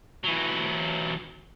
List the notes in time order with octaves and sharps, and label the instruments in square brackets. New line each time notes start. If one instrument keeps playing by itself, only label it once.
[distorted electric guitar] E3 F#3